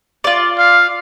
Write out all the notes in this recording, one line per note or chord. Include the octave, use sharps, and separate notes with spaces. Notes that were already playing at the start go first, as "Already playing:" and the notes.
F4 D5
F5